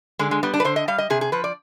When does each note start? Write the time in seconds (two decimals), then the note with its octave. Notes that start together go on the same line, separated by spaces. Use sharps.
0.19 D3 G#3
0.31 G#3
0.43 G3 B3
0.54 D4
0.60 B4
0.64 D3 C5
0.76 D#5
0.88 G3 F5
0.98 D#5
1.10 C3 G#4
1.21 G#4
1.32 F3 B4
1.44 D5